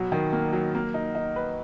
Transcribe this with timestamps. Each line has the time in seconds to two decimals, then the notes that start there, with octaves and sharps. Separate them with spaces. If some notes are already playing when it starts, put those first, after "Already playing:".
Already playing: B2 F#3
0.12 D#3
0.32 A#3
0.53 F#3
0.75 A#3
0.94 D#4
1.15 D#4
1.36 B4